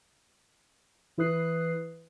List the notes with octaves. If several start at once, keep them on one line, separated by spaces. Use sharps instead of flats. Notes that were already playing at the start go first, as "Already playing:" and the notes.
E3 E4 B4 D#6 F#6 C7